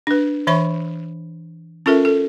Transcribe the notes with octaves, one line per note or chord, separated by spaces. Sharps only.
D4 B4
E3 C#5 E5 B5 C#6
C#4 F4 A4 A#4 E5
A4